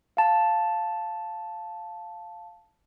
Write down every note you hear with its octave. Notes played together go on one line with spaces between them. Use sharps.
F5 A5